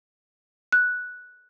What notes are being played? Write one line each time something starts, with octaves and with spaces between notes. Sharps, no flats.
F#6